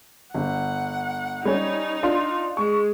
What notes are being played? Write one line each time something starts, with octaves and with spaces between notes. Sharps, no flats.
G1 F#5
G3 C#4 D#4
D4 F4 C6
G#3 C#6